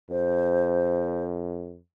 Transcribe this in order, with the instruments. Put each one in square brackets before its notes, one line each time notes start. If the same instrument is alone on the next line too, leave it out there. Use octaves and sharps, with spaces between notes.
[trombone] F2 [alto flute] C5